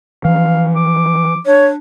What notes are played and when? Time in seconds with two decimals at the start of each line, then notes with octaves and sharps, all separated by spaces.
0.25 E3 F3 C#4 F5
0.76 D6
1.46 D4 C#5